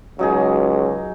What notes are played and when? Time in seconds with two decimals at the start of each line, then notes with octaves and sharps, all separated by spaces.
0.19 C#2 F#3 D#4 G#4